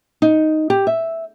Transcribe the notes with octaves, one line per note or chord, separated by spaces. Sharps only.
D#4
G4
E5